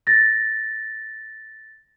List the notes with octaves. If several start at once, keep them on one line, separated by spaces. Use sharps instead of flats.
A6 A#6